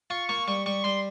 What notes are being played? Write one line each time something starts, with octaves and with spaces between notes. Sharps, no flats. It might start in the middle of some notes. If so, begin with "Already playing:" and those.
F4 C#6
A#3 C#6
G3 C#6
G3 C#6
G3 C6